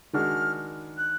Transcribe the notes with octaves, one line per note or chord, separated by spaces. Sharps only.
D#3 G#3 D4 F#4 F6
F#6